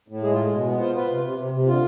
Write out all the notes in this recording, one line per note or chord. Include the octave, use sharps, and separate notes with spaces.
A2
G#3 G#4
F4
G#3
B2
B3
F4 C5
F4 B4
C3
C3
C3
C3
D3 F4